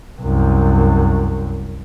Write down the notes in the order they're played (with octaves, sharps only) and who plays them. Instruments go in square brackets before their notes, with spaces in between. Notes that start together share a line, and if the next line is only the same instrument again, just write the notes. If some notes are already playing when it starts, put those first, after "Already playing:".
[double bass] C2 F#2